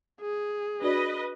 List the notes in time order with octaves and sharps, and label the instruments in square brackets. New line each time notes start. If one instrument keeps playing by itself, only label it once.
[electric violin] G#4
[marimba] D4 F#4 D5 [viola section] B4 D#5